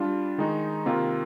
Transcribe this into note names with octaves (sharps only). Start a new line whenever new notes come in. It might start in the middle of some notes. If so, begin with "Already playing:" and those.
Already playing: G3 D4 F4
D#3 G#3 D#4
C3 D#3 A#3 F4